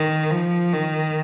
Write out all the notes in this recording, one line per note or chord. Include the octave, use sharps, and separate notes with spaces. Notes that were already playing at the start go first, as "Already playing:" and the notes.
Already playing: D#3
F3
D#3